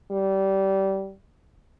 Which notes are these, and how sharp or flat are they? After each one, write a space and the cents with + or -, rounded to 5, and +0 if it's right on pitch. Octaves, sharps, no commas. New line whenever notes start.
G3 -20